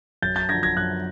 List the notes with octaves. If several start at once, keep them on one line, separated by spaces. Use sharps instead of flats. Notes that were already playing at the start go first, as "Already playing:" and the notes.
F#2 G6 A6
G6 A6
D3 F3 G#6 A#6
G#6 A#6
F#2 F#6 G#6